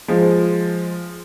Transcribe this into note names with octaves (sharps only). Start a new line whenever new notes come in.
F3 G#3